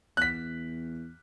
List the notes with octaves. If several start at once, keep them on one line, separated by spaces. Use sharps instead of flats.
E2 F#6 B6